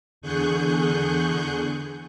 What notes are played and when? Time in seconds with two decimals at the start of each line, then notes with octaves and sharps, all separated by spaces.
0.22 E2 D3 G#4 C#6 F#6 G6